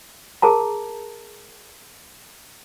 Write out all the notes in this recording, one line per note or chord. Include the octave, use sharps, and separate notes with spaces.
G#4 A#4 A5 A#5